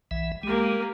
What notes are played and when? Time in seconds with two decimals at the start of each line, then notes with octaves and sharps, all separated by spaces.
0.11 B1 E3 E5
0.43 G#3 A#3 G4